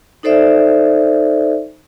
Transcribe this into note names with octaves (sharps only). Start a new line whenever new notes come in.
D#4 A4 C5 D5 E5